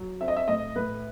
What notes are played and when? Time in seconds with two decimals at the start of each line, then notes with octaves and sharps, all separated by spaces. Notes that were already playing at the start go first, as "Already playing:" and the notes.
Already playing: F#3
0.21 C4 E5
0.28 D#5
0.36 E5
0.48 A2 D#5
0.76 A2 B4